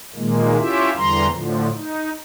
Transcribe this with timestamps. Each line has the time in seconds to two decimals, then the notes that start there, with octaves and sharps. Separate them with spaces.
0.15 A#2 D#3 G#3 A#3
0.57 C#4 E4 F4 G4 E5
0.96 E2 D3 E3 G3 A#5 C6
1.29 A2 D3 F3
1.75 D#4